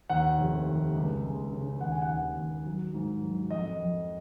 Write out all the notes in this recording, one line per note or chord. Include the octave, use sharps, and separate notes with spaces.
D#2 F#5
F1
D#2
C#2
G#3
C#3
D#2 F#5
G#5
F#5
D#2
D#2
F#3
G#2
F#3
F2 D#5
F2